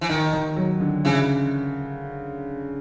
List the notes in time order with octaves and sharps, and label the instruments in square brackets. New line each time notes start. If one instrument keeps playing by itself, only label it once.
[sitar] E3
[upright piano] D#2 [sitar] D#3
[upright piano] D#2
F#3
D3
[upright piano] C#3 [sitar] E3